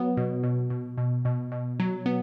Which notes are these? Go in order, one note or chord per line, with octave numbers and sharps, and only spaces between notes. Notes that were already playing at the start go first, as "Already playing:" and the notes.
Already playing: F#3 B3
B2
B2
B2
B2
B2
B2
F#3
B3